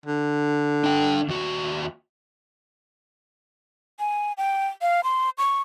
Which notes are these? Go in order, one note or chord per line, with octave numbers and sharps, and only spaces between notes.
D3
D4 G5
D#2 F#4
G#5
G5
F5
C6
C#6